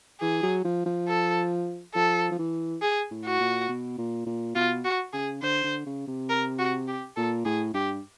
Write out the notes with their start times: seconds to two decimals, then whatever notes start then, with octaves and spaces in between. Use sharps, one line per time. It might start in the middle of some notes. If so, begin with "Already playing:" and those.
0.21 E3 G#4
0.43 F#3
0.64 F3
0.86 F3
1.08 A4
1.95 F3 A4
2.31 F3
2.38 E3
2.82 G#4
3.11 A2
3.25 F#4
3.40 A#2
3.69 B2
3.98 A#2
4.26 A#2
4.55 B2 F4
4.85 F#4
5.13 C#3 G#4
5.42 D3 C5
5.64 D3
5.86 C#3
6.08 C3
6.29 A#4
6.59 F#4
6.87 G4
7.16 A#2 A4
7.45 A2 G#4
7.74 G2 G4